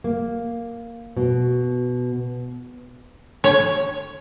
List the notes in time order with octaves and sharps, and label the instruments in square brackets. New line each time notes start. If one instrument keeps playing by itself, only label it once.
[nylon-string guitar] A#3
B2
[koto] C#5